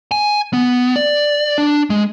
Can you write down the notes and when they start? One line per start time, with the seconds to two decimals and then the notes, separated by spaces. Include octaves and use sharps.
0.11 G#5
0.53 B3
0.96 D5
1.58 D4
1.90 G#3